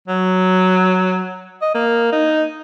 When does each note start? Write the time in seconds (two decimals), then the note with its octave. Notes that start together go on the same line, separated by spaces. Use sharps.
0.08 F#3
1.62 D#5
1.75 A#3
2.12 D#4